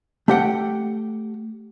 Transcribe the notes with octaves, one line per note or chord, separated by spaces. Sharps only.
A3 G4 F#5 G5